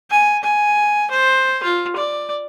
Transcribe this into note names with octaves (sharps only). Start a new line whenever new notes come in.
G#5
G#5
C5
F4
D5